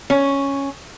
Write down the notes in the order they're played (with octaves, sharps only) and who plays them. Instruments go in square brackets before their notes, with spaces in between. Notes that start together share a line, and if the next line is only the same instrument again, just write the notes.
[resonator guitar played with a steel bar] C#4